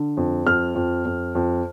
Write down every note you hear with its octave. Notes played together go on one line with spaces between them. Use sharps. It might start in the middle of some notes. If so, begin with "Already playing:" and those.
Already playing: D3
F2
F2 F6
F2
F2
F2